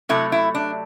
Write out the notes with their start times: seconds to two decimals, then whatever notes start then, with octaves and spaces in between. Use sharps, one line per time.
0.09 C3 F#3 A3 E4
0.32 E4
0.55 D4